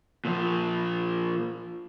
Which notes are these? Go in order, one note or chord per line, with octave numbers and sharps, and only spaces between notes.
A#2 F3